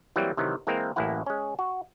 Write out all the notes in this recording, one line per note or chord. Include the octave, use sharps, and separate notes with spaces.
E3 F#3 G3 A#3 C4
C3 D#3 E3 F#3
E3 G#3 A#3 C4 A#4
A1 F#2 A#3 E4 F#5
G#3 C#4
F#4